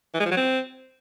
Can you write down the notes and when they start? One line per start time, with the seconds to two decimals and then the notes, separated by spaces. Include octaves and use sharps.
0.14 E3
0.20 G#3
0.25 F3
0.31 F#3
0.37 C4